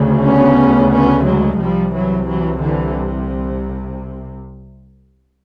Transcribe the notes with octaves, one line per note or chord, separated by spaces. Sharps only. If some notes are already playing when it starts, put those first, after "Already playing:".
Already playing: D2 C#3
B3 C#4
B3 C#4
F#3 G#3
C2 C3 F3 G3
E3 F#3
E3 F#3
D3 E3